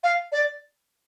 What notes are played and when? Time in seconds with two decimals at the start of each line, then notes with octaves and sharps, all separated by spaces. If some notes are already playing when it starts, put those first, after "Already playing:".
0.03 F5
0.32 D5